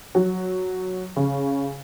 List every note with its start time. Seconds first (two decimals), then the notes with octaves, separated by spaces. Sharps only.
0.15 F#3
1.16 C#3